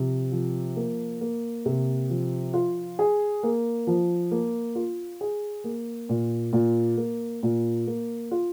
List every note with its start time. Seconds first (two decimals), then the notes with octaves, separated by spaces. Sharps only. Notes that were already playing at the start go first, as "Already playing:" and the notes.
Already playing: C3 F3
0.32 F3
0.76 A#3
1.21 A#3
1.65 C3
2.10 F3
2.54 F4
2.99 G#4
3.43 A#3
3.87 F3
4.31 A#3
4.75 F4
5.21 G#4
5.64 A#3
6.09 A#2
6.53 A#2
6.97 A#3
7.43 A#2
7.87 A#3
8.31 F4